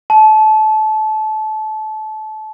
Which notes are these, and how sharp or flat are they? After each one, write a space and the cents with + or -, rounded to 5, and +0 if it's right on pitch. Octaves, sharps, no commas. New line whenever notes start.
A5 -25